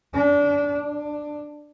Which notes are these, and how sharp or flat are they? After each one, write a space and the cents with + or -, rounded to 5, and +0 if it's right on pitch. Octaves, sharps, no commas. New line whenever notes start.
D4 -25
D4 +10